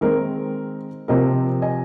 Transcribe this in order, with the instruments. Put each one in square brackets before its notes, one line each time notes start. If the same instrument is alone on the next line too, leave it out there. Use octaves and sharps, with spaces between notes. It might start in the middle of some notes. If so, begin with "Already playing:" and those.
[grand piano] D#3 G#3 C4 A#4
C3 F3 C4 A#4 D#5
D#5 G#5